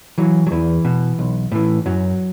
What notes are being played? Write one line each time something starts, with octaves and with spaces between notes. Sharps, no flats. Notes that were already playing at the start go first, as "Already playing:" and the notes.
E3 F#3
F#3
E2 E3
B2
B1
A2 E3
F#2 F#3